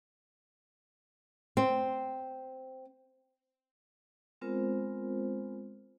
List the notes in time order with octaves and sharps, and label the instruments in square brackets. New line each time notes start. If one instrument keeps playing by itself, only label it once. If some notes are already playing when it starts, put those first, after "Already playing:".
[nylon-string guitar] C4
[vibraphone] G#3 B3 C4 F4 A#4 C5